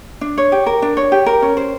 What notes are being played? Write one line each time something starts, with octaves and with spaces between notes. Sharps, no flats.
D4
C#5
G4
A#4
D4
C#5
G4
A#4
C#4
C5